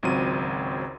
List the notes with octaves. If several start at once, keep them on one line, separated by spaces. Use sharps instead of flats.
G#1 C#2 F#3 C4 F4 D#7